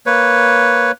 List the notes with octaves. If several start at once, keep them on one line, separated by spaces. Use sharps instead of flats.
A#3 B4 C#5